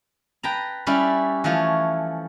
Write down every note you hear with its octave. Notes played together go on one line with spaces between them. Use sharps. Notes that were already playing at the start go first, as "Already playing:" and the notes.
B4 G5 A5 A#5
G3 C#4 E4 B4 D5
E3 F3 A3 C#5